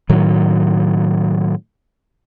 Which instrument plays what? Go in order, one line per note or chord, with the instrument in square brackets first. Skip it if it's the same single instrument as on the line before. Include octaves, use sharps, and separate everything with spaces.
[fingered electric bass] A2 D#3 F#3